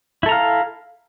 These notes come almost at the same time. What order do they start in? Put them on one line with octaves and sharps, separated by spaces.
E4 A4 A#5 F5